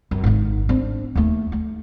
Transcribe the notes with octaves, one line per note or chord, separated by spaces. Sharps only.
F#2
G#1 D#3
C4 D4
D#2 A3
A3